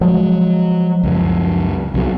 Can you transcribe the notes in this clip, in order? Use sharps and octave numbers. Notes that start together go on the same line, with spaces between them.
F3 F#3 G#3
C#2 F#2
C2 E3 F#3